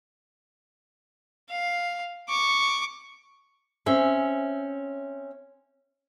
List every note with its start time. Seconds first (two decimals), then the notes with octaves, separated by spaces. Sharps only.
1.50 F5
2.29 C#6 D6
3.86 C4 C#4 E5